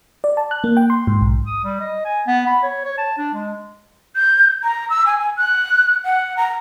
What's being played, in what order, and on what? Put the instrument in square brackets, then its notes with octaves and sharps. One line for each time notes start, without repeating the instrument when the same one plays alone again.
[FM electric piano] D5
A5
F#6
A#3
G5
C6
G#2
B1
[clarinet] D#6
G3
D#5
G#5
B3
B5
C#5
C#5
A5
D4
G#3
[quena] G6
A#5
E6
G#5
G#5
F#6
F#5
A#5